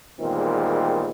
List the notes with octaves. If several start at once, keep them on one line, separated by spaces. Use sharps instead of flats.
E2 A#2 D#3 G3 G#3 C4